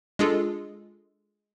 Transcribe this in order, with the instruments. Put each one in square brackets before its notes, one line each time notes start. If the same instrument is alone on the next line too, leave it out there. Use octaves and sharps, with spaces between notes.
[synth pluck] G#3 D4 F4 G#4 A4